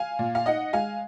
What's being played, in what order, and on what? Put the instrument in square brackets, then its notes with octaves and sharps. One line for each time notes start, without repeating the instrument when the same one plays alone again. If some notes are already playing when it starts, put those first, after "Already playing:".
Already playing: [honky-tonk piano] F5 G#5
A#2
F5
D#4 D#5 F#5
G#3 F5 G#5